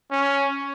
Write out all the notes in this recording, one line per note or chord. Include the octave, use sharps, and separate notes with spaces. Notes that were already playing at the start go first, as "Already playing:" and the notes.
C#4